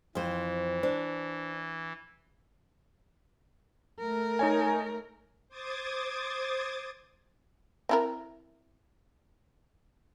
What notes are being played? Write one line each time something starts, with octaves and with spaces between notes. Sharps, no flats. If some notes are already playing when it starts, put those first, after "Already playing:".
F2 E3 C5
D4 C5
A3 A#4
D#4 C#5 G#5
C5 D6 D#6 G#6 A6
C4 E4 A#4